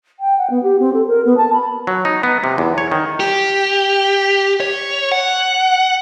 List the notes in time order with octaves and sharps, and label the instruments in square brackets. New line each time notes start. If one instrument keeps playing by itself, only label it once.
[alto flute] G5
F#5
B3
G4
C4
A4
A#4
B3
A5
B5
[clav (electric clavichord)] F#3
D#4
B3
C3
E2
C#5
D#3
[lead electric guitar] G4
C#5
F#5